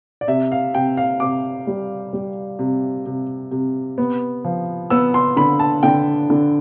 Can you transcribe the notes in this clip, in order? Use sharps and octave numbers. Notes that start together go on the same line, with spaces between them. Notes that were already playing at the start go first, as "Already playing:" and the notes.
D5
C3 E5
F5
C3 G5
F5
C3 D6
G3
G3
C3
C3
C3
B3
F3
B3 E6
C6
D3 B5
A5
D3 G5
D3